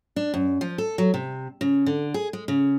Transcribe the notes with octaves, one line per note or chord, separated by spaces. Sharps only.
D4
F#2
F3
A4
F#3
C3
C#3
D3
G#4
G#3
C#3